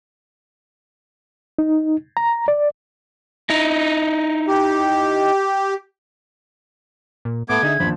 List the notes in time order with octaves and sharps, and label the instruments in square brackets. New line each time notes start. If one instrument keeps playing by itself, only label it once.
[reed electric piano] D#4
A#5
D5
[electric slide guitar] D#4 E4
[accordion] G4
[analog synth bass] A#2
[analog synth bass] A2 [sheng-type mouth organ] A3 B3 D6 [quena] G#6
[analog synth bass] D3 [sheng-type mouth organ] D#4 [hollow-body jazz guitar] G#4 D#5 E5
[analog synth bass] G1 [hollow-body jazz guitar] D#2 F3 D4 [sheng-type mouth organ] B5